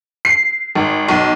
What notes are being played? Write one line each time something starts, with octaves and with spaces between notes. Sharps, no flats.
C7
G#1
B1